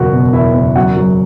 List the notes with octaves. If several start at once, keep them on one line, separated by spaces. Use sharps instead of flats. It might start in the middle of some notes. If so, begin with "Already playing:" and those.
Already playing: F#1 E2 B2 A#3 F#4 F#5
B2
E2 E4 E5
F#1
F#2 F#4 F#5
F#3